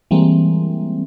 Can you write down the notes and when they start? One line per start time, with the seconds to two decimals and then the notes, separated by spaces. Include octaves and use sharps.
0.11 E3 G3 G#3 A#3 C4